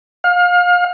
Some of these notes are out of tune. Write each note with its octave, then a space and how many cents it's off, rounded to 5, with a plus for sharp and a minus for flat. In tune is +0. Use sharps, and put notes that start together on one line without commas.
F5 +30